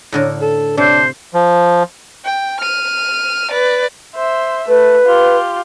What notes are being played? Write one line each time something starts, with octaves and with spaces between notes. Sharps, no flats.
A2 D3 A#4
A4
C3 D4 C5
F3
G5
F6 D#7
B4 D5
C5 E5
A3 B4
F4 G4